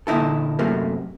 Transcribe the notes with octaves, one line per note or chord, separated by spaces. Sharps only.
A#2 D3 D#4 E4 A4
F#2 C3 A3 A#3